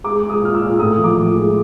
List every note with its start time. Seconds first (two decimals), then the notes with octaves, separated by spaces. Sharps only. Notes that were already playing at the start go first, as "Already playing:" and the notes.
0.04 G#3 D6
0.23 G#3
0.30 D#6
0.41 A#2 F6
0.55 E6
0.61 A#2
0.79 A2 D#6
0.98 F3
1.04 D6
1.16 F3
1.34 G#3